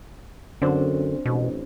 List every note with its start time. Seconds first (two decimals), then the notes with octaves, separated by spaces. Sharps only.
0.62 F#2 D3 C4 D4 C5
1.26 A1 B2